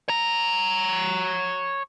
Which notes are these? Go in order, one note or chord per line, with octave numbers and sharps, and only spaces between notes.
C#5 A#5